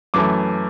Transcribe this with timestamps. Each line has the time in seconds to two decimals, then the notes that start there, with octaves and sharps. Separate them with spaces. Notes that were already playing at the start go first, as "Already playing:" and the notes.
0.14 F#2 E3 A3 D6